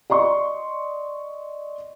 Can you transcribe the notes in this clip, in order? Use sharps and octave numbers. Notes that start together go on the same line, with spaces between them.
D5 D#5 C6 C#6